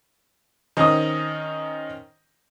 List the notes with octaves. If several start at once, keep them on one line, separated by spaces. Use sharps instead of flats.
D#3 C4 C#4 D#5 D#6